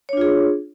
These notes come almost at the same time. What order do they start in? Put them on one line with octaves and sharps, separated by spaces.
C#5 D4 F4 G#4